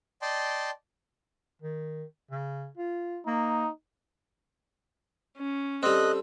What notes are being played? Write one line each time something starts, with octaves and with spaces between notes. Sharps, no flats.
D5 D#5 G5 A5 C6
D#3
C#3
F4
A#3 D#4
C#4
G3 C4 A4 D#5 F#6